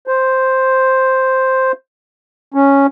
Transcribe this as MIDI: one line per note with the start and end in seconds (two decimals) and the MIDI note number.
0.07 1.72 72
2.54 2.87 61